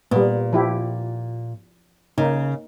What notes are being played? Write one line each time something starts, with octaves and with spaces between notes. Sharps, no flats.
A#2 G3 B3
F3 E4 G4
C#3 A#3 D#4